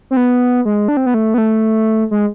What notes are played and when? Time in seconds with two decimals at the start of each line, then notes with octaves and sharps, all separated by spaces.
0.11 C4
0.17 B3
0.65 G#3
0.88 D4
0.97 C4
1.06 B3
1.14 A3
1.34 B3
1.38 A3
2.11 G#3